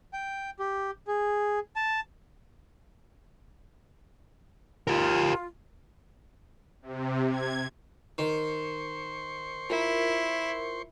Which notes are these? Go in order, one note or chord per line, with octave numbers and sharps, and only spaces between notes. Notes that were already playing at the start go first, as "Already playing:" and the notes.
G5
G4
G#4
A5
F4 G4 A#4
C3
G#6
D#3 C5 C6 C#6
E4 F4 A#4